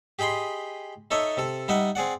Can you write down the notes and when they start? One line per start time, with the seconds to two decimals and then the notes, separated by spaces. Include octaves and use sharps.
0.19 G4 G#4 D#5 B5 C6
1.11 D#4 A4 C#5 D#5 E5
1.37 C3 A4
1.68 G3 D#4 D#5 E5 F#5
1.95 C4 G#4 D5 F#5